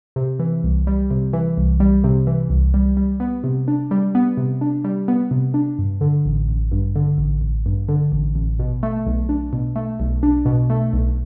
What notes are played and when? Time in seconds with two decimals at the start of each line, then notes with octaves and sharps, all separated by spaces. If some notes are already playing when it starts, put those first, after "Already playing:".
0.16 C3
0.39 E3
0.64 C2
0.87 G3
1.11 C3
1.33 E3
1.57 C2
1.80 G3
2.04 C3
2.27 E3
2.50 C2
2.74 G3
2.97 G3
3.20 B3
3.44 C3
3.68 D4
3.91 G3
4.15 B3
4.37 C3
4.61 D4
4.84 G3
5.08 B3
5.31 C3
5.54 D4
5.79 G2
6.01 D3
6.25 A1
6.48 A1
6.72 G2
6.96 D3
7.18 A1
7.41 A1
7.66 G2
7.89 D3
8.12 A1
8.35 A1
8.59 B2
8.83 A3
9.06 B1
9.29 D4
9.53 B2
9.76 A3
10.00 B1
10.23 D4
10.46 B2
10.70 A3
10.93 B1